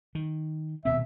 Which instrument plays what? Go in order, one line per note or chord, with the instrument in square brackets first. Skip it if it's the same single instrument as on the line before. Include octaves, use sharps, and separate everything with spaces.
[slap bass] D#3
[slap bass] D#1 B2 C4 [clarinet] E5